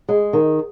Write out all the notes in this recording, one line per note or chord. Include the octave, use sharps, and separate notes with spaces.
G#3
D#3